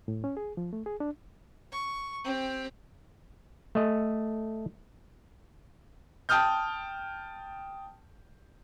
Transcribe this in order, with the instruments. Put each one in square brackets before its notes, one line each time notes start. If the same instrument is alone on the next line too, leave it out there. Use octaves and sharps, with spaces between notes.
[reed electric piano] A2
C#4
G#4
F3
A3
G#4
D4
[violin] C#6
C4 G4
[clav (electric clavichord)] A3 D#5
[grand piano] G5 A5 D#6 F6 G6